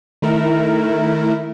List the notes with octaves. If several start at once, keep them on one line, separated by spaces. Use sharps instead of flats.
D#3 A3 E4 A#4